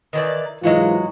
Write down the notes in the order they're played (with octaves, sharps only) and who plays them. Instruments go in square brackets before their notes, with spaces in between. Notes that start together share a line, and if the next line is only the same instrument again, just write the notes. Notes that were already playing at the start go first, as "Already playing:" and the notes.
[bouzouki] D#3 E3 D5
[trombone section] G#2 E3 F4 [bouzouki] F#3 G#3 F#4